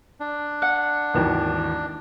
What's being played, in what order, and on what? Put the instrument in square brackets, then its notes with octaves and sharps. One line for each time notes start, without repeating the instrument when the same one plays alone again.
[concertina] D4
[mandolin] F#5
[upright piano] G#1 D#2 E3